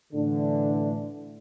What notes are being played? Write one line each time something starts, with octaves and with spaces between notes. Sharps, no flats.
A2 D3 E3 D4